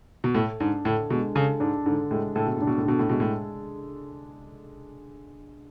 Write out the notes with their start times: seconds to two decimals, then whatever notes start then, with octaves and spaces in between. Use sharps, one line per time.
0.24 B2
0.35 A2 A4
0.60 G#2 D4
0.85 A2 D3
1.10 B2 G#3
1.35 C#3 A4
1.60 G#2 D4
1.86 G#2 D3
2.11 A2 G#3
2.36 A2 A4
2.46 B2
2.57 A2 D4
2.67 B2
2.78 A2
2.86 B2 D3
2.99 A2
3.09 B2 G#3
3.20 A2